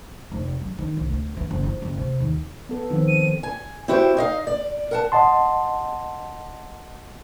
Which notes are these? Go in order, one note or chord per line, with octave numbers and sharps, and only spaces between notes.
F1
F#3
D#3
C2
D2
E3
F#1
F3
F#1
C3
D#2
B3 A4
D#3 F3 C4
D#7
G#5
C4 E4 F#4 G4 C5
D#4 D#5 F5
D5
A#4 F#5 A5
D#5 F#5 A5 C6